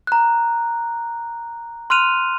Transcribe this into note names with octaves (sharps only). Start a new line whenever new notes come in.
A#5 F#6
C6 F6 F#6 D#7 F7